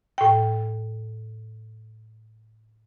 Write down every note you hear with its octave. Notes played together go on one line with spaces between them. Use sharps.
A2 G5